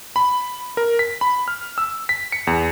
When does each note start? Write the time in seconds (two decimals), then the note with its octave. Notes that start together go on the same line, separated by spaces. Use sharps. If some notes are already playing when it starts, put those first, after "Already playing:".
0.16 B5
0.77 A#4
0.99 B6
1.21 B5
1.48 F6
1.78 E6
2.09 B6
2.32 C#7
2.47 E2